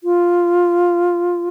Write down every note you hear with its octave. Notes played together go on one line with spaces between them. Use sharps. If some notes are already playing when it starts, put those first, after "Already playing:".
F4